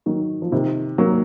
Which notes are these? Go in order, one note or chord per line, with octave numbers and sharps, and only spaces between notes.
D#3 F#3
F3
C3 D#3
F#3 A#3